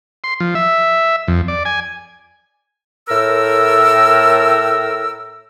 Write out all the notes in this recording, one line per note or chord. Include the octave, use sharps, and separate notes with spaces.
C6
F3
E5
F2
D5
G#5
A2 A#4 E6